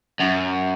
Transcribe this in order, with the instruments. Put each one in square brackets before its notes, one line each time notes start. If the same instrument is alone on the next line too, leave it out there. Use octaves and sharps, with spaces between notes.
[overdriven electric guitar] F#2